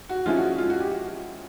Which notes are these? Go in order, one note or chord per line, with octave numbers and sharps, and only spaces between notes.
F#4
F3 G#3 C#4 E4 F4
F#4
F4
F#4
G4
F#4